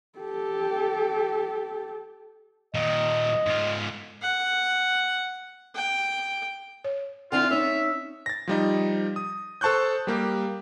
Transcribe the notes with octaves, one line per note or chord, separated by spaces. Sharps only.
G4 A4
A#2 D#3 D#5
G#2 F4
F#5
G5
C#5
D3 C4 D4 E4 F4 F#5
C#4 D#4 E5
A6 A#6
F3 G3 D#4
D#6
A4 C5 A5 C#6 F#6 G6
G3 A#3 G4